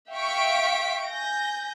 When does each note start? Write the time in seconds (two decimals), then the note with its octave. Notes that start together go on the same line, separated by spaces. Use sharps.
0.14 E5 F5 G5 C#6 B6 D7
1.08 G#5 G6 A#6